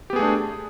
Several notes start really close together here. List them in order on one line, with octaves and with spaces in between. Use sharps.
G4 B3 G#4 A3 D4